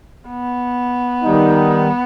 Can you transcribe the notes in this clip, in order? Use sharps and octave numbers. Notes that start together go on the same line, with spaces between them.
B3
D#3 G3 D#4